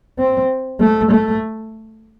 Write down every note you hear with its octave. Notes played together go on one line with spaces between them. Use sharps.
C4
A3
A3